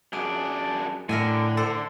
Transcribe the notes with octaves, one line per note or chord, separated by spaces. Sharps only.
F#2 D4 G#4
A2 D3 A#4 E5 G#5
A4 C5 F#5